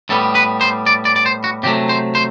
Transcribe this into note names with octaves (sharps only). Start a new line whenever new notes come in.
A2 G3 B3 A4
B4
C5
D5
D5
D5
C5
F#4
C3 F#3 A3 G4
C5
C5